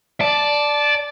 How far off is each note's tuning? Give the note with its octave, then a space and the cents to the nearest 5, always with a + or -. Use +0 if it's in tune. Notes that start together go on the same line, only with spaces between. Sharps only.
D5 +0 A5 -15